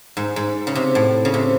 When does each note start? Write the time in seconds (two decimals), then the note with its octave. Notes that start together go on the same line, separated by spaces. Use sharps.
0.17 G#2
0.36 G#2
0.67 C#3
0.75 C3
0.95 A2
1.25 C#3
1.34 C3